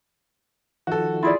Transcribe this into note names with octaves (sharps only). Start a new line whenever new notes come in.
D#3 F3 F#4 A4
E4 F4 G#4 D5